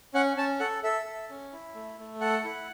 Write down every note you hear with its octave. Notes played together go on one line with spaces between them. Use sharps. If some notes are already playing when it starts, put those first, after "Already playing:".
C#4 F#5
C#4 A5
A4 F#5
A4 E5
A4
C#4
E4
A3
A3
A4 F#5
E4